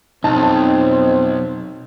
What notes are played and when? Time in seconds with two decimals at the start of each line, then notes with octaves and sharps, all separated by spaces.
0.24 B1 F2 C4 D#4 A5